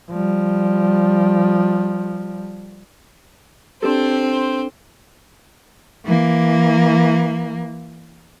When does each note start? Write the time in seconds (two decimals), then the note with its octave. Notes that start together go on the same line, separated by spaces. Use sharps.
0.10 F3 G3
3.82 C4 D4 G4 A4 C5
6.05 E3 A#3